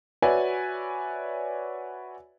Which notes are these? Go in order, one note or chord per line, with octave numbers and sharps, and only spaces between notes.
F#4 B4 C#5 D5 E5 G#5